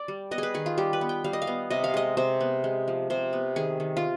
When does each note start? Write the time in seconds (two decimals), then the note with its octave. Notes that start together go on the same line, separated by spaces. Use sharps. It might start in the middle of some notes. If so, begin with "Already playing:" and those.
Already playing: D5
0.08 G3
0.31 B3 D#5
0.38 G#4 B4
0.54 D#3 G#4
0.66 F4
0.78 G3 G4
0.93 B4
1.01 B3
1.09 G5
1.24 G3 F5
1.33 D#5
1.42 F5
1.47 B3
1.70 C3 D#5
1.84 F5
1.94 G#3 D#5
2.17 C3 C5
2.41 B3
2.64 G#3
2.88 F3
3.10 C3 C5
3.33 B3
3.56 D#3 G#4
3.80 D#3
3.97 F4